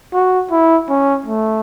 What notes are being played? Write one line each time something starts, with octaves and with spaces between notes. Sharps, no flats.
F#4
E4
C#4
A3